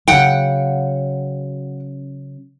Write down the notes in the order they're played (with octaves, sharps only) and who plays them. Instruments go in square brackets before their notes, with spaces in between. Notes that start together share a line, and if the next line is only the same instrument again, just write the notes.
[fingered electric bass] C#3 F#3 [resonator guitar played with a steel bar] F#5 G5